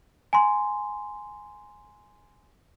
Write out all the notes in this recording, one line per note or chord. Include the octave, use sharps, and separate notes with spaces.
G#5 A#5 C6